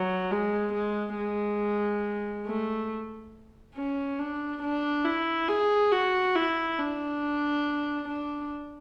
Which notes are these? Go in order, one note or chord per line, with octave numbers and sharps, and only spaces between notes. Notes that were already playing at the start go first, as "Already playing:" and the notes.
Already playing: F#3
G#3
G#3
G#3
A3
C#4
D4
D4
E4
G#4
F#4
E4
D4
D4